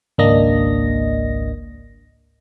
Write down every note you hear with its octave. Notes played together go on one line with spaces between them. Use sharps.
G#1 C#2 A#3 D4 D#5 A#6